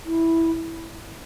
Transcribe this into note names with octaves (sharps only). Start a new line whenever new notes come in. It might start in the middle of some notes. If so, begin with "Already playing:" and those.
E4